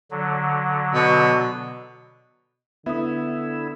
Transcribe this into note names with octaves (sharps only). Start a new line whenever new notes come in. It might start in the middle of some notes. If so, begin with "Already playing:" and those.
D3 F#3
B2
D3 B3 E4 E5 D#6